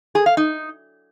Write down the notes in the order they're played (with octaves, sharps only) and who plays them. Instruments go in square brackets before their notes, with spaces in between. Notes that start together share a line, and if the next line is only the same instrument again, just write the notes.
[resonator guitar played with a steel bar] G#4
F5
D#4